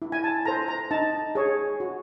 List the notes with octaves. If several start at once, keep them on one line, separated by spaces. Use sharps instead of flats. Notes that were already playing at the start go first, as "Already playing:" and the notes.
E4
G#5
A5
A4 C5 A#5
A#5
D#4 A5
G#4 C#5
F#4